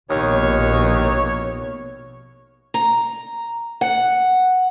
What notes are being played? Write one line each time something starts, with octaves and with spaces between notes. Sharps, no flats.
A#1 D#2 B2 C#5
A#5
F#5